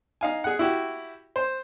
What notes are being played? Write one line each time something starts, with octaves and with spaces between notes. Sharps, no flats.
D#4 F5 G#5
G#4 F#5
E4 F#4 G4
C5